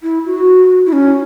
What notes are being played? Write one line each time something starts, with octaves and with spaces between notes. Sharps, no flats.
E4
F#4
E4
C#4